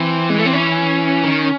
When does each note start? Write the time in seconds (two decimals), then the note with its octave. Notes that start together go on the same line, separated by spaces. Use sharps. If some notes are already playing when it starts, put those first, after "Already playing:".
Already playing: E3 C4
0.30 G#3
0.38 A3
0.46 C4
0.53 C#4
1.24 D#3